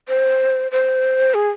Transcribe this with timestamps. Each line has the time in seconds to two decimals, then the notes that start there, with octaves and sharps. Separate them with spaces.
0.08 C5
0.72 C5
1.34 G#4